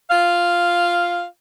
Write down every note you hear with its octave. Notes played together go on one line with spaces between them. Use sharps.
F4 F5